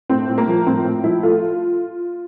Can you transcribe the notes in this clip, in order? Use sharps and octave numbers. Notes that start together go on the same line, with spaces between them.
A2 C4
A2
A#3
F3
A2 C4
A2
F3 E4
A3 F4